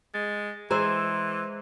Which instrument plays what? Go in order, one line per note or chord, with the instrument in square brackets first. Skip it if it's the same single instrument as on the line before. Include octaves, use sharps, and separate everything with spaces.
[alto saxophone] G#3 [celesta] A6
[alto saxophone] E3 [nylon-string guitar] G#3 G#4 C5 [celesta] A#5 C6 E6